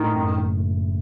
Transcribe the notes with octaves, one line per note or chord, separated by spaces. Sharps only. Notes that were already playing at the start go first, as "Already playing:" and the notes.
Already playing: A2 D#3
F#2
F#1